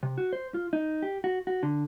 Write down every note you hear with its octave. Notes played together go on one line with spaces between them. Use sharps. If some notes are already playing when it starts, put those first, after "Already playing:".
C3
F#4
C5
F4
D#4
G4
F#4
F#4
D3